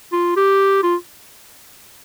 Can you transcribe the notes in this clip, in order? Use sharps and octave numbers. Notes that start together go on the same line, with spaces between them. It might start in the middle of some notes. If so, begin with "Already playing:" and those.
F4
G4
F4